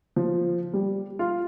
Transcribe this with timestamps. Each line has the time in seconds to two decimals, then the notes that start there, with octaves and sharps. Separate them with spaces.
0.16 F3
0.74 G3
1.19 F4